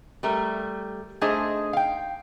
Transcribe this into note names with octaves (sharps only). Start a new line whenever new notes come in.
G3 A3 A#4
A3 D4 D#4 G#4 C5 D#5
F5 G5